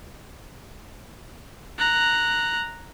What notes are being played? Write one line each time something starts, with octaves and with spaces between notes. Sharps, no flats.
A#5 F#6